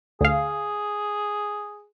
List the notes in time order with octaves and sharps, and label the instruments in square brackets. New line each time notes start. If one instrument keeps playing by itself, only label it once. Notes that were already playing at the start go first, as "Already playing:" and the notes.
[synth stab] D2 F5 [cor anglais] G#4